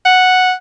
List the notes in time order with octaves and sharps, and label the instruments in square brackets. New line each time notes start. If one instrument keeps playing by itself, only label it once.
[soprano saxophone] F#5